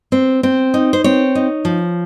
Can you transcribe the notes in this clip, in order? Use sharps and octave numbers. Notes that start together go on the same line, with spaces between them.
C4
C4
D#4
C5
C4 C#5
D#4
F3